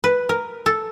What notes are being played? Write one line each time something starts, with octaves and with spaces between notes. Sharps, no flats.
B4
A#4
A4